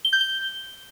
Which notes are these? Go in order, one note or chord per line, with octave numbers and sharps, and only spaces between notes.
G7
G6
G7